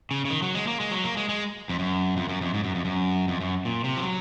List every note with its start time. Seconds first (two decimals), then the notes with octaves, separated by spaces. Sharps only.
0.11 C#3
0.25 C#3
0.29 D#3
0.42 F#3
0.55 G#3
0.67 A#3
0.80 G#3
0.92 F#3
1.04 A#3
1.17 G#3
1.29 G#3
1.69 F2
1.79 F#2
2.17 F2
2.29 F#2
2.41 F2
2.54 G#2
2.64 F#2
2.75 F2
2.85 F#2
3.28 F2
3.41 F#2
3.65 A#2
3.84 C3
3.97 F3
4.03 F#3